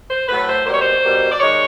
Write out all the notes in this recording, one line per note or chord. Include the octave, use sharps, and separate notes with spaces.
C5
A2 F#3 A3 B4
C5
B2 G3 A#3 C5
C#5
C5
B2 G3 A#3
D5
D#3 G#3 C#5